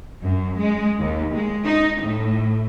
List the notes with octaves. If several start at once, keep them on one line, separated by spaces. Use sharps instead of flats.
F#2
G#3
D#2
G#3
D#4
A2